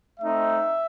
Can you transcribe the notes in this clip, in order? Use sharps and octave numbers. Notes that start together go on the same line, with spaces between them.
A3 C4 D#4 E5